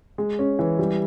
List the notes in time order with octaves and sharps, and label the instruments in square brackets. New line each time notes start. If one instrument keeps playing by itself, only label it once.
[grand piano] G#3
C#4
E3
G3